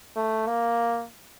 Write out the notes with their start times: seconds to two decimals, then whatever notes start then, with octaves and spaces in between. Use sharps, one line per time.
0.16 A3
0.47 A#3